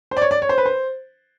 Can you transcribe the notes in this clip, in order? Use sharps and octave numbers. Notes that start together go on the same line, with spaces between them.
C5
D5
C#5
D5
C#5
C5
B4
C5